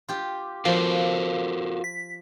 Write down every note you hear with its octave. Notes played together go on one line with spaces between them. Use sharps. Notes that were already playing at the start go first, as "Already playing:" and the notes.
F4 G4
F3 F4 F#4 A#4 F5
B6